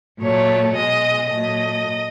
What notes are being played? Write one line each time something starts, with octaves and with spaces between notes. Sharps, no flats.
A#2 F#3 A3 C#5
B2 G#3 D#5
A#2 F#3 A3 D#5